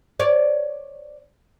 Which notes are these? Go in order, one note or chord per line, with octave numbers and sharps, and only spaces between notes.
C#5 D5